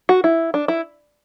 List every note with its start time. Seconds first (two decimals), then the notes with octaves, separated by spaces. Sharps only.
0.09 F#4
0.24 E4
0.54 D4
0.68 E4